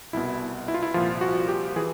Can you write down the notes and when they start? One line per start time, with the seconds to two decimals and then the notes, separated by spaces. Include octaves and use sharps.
0.13 C2 B2 E4
0.68 E4
0.74 F4
0.83 E4
0.94 C2 A#2 F3 F4
1.21 F#4
1.48 G4
1.76 E3 G#4